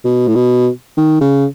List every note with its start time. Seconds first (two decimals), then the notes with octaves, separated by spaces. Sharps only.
0.05 B2
0.28 A2
0.36 B2
0.97 D#3
1.21 C#3